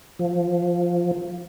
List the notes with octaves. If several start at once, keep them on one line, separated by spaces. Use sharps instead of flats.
F3